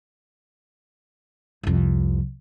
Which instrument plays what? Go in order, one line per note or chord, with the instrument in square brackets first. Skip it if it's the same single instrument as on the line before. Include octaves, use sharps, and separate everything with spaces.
[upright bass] C2 F2